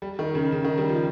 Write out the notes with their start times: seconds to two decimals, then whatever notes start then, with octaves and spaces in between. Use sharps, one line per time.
0.02 G3
0.19 D#3
0.35 C#3
0.52 C#3
0.64 D#3
0.78 G3
0.89 F3